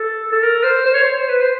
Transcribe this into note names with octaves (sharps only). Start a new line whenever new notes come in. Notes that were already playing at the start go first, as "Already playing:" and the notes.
Already playing: A4
A4
A#4
C5
C5
C#5
C5
B4
C5